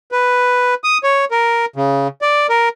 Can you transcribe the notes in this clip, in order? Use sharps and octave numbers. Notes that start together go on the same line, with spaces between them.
B4
D#6
C#5
A#4
C#3
D5
A#4